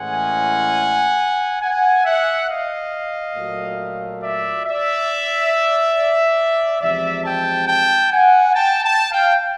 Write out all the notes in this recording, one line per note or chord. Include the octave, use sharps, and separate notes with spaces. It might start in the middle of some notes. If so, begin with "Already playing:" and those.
Already playing: A2 E3 G#3 C#4 F#5 G#5
F#5 G#5
E5 F#5
D#5 F5
A#2 F#3 A3
D5 E5
D5 E5
E2 C3 F3 G#3 D5 E5
G5 A5
G5 A5
F#5 G#5
G5 A5
G5 A5
F5 G5